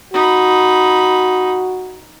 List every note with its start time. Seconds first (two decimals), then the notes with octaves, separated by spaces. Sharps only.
0.14 D#4 F#4 B5